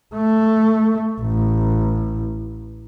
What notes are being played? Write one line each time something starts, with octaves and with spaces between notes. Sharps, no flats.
A3
A1